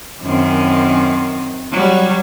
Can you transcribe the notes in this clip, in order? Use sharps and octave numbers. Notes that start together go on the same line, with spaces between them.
F#2 D#3 C4
F#3 G3